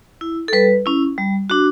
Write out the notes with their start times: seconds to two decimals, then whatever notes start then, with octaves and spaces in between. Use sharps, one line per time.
0.21 E4
0.48 A4
0.53 G3 B4
0.86 C#4 E4
1.18 G3
1.50 D4 F#4